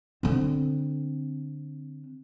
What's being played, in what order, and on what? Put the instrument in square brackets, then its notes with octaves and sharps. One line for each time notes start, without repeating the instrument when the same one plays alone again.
[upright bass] D3 C4